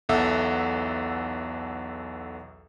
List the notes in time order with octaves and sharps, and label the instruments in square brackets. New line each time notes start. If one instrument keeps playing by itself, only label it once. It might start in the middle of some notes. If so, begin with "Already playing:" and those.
[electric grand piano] B1 E2 A4 E5 F#5